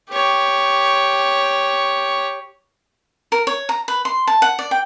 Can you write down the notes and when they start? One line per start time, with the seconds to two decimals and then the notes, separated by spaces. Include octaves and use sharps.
0.10 G4 C#5
3.32 A#4
3.47 C#5
3.69 A#5
3.88 B4
4.05 C6
4.27 A5
4.42 F#5
4.59 D5
4.71 G5